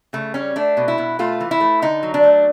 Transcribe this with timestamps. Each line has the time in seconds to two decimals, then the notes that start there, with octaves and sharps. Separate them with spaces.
0.13 C#3 A3
0.34 G3 C#4
0.56 A3 D4
0.77 B2
0.88 E4
0.98 B2
1.19 A3 F4
1.40 E3
1.51 E4
1.60 A3
1.82 D3 D#4
2.03 F#3
2.14 D4
2.23 A3